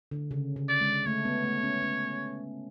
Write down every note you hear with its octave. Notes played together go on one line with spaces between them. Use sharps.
D3
C#3
C#3
D5
G#3
A3 C#5
B3
A3
C#4
C#4